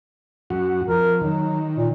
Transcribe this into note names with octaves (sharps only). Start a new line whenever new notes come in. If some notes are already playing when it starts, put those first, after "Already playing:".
F#2 F#4
F2 A#4
D#3 F#3
A#2